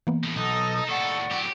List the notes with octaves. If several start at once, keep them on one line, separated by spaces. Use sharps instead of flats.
E3 A#3 B3
A2 D#3
B1 D#4 A4 D#5 D#6
D#2 A2 A4 D5 F#5 C#6
A2 F#3 G4